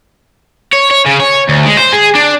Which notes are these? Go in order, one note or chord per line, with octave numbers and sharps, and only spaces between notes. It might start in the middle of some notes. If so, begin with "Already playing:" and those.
C#5
C#5
C#3
C#5
D2
G#3
C5
G#4
D4